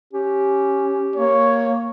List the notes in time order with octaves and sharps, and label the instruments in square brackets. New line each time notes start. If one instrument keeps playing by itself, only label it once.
[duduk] C#4 [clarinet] G4
[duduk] A#3 [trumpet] C#5